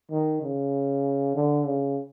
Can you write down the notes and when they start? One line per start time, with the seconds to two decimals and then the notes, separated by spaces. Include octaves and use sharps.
0.11 D#3
0.42 C#3
1.35 D3
1.65 C#3